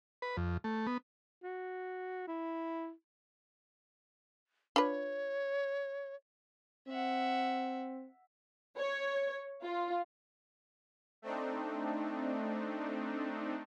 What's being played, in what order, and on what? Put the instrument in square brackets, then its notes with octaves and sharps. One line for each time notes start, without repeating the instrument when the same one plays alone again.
[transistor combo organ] B4
F2
A3
B3
[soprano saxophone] F#4
E4
[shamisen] D4 F4 B4 [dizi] C#5
[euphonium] C4 [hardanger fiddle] E5 F#5
[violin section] C#5
F4
[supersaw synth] A3 C4 D4 D#4